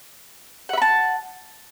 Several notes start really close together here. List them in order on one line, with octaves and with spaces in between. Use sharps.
F#5 E5 B5 A5